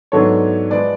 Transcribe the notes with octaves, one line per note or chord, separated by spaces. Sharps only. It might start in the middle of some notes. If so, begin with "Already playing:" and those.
G#2 F#3 B3 D4 A4 C#5
F3 G#3 B4 D5